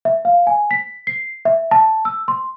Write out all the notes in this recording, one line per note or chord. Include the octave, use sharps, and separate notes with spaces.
E5
F5
G#5
B6
C7
E5
A5
E6
C6